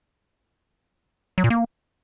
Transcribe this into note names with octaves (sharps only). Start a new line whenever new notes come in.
F#3
A#2
A#3